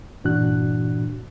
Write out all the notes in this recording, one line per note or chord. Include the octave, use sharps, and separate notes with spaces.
G2 A#2 E3 D4 F#4 F#6